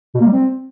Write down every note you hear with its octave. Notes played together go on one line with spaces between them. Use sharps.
B2
A#3
G3
C4